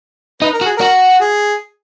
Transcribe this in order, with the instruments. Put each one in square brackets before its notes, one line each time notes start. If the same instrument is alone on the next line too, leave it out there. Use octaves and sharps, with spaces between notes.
[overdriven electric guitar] D#4 [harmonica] B4
[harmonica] A#4
[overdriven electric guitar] F#4
[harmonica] G#4
[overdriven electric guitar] F#4 [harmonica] A#4
[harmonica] G#4